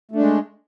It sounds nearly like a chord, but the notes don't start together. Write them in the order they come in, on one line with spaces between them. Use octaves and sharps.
A3 D4 G#3